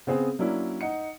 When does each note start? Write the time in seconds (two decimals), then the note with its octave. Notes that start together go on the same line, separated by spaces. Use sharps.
0.07 C#3 B3 C4 G#4 C5
0.39 F#3 A#3 C#4 D4 E4
0.81 D#4 F#5 C#7